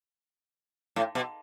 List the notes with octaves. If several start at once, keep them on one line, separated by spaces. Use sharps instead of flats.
A2
B2